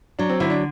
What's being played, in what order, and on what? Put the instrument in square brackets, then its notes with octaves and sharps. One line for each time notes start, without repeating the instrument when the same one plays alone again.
[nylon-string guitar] F#3 [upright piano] D4
[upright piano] C4
[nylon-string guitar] D3 [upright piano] E4
[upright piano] D4